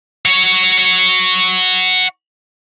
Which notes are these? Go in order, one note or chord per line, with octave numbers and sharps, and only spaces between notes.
F#4 C#5